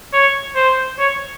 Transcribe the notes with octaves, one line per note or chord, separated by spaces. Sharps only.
C#5
C5
C#5